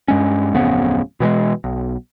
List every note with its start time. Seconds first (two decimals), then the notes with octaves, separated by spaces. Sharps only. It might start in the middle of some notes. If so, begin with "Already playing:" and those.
0.08 G2 G#3 C#4
0.54 D1 F2 C#3 B3
1.20 B2 E3 G3 G#3
1.64 B1